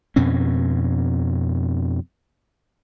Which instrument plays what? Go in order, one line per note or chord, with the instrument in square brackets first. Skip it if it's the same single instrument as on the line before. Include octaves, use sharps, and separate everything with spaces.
[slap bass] F2 B2 C4 C#4